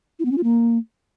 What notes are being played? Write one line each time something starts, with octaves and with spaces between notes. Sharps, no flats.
E4
B3
C#4
F4
A#3